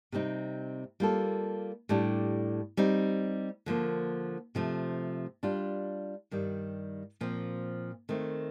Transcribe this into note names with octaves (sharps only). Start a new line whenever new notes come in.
C3 G3 C4 D#4
G3 A#3 F4 A4
A2 G3 D4 G4
G3 C4 D#4
D3 F3 A#3
C3 F3 A3
G3 D4 F4
G2 D#3 G3
A#2 F3 C4
D#3 A3 C4